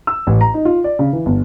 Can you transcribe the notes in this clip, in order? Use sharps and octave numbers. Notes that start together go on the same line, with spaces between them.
E6
A1
A#5
D#4
F4
D5
C#3
E3
G1